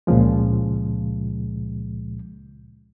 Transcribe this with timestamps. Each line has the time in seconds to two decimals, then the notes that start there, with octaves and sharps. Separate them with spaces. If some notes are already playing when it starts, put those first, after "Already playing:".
0.07 C#2 A#2 C#3 F3 G#3